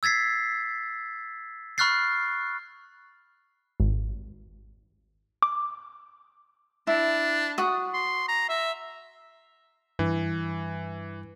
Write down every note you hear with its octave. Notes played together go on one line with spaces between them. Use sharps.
E6 G#6 A6 B6 C7
B5 C#6 F6 F#6 A6 C7
G#1
D6
D4 E4
F#4 D#6
C6
A#5
E5
G2 E3